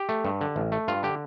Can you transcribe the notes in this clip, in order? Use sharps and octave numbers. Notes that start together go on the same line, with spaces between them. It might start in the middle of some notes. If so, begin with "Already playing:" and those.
Already playing: G4
A3
G2
D3
A1
A3
G2 F4
D3 G4